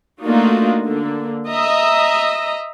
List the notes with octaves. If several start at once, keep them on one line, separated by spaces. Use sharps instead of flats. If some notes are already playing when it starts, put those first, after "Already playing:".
A3 A#3 D4 D#4 F4 F#4
D3 A#3
D#5 E5 A#5